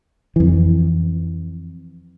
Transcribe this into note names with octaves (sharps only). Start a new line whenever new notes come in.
F2 E3